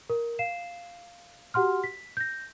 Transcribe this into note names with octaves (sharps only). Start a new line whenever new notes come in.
A#4
F5 C7 E7
F#4 G4 F#5 C6 F6
B6
G6 A#6